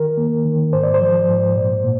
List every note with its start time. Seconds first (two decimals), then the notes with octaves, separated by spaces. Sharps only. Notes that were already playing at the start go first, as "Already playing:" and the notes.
Already playing: D#3 A#4
0.17 A#3
0.45 D#3
0.73 G#2 C5
0.83 D5
0.94 C5
1.01 F3
1.28 G#2
1.56 A#2
1.84 A#2